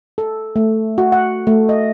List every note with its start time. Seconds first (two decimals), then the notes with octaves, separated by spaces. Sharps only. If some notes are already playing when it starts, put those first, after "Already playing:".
0.18 A4
0.56 A3
0.98 F#4
1.12 F#5
1.47 A3
1.69 D#5